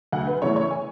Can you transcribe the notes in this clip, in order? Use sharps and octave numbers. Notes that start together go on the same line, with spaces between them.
D2 F#5
B4
C#3 E3 A3 C#5
C#5
G#5